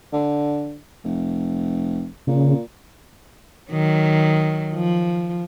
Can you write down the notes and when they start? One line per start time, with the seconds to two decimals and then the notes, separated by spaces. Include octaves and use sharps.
0.13 D3
1.04 F1
2.27 A#2 C#3
3.72 D#3 F#3
4.75 F3